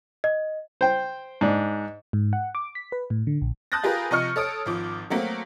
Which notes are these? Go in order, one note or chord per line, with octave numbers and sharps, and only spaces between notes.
D#5
C5 G5
G#2 D4
G#2
F#5
D6
B6
B4
A2
D3
A#1
A5 D#6 F#6 G6 A6 A#6
F4 G4 G#4 A#4 B4
C3 F3 D#5 C#6 F6 C#7
A4 C#5 D#6 D7
G#1 F3 D6
F#3 A3 A#3 C4 F#4